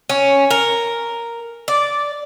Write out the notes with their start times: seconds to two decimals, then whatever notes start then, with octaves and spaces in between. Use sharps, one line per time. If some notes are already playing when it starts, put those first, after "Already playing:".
0.10 C#4
0.51 A#4
1.68 D5